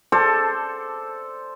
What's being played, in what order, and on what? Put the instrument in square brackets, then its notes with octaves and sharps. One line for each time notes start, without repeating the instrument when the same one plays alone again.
[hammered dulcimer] A4 C5 D5 A5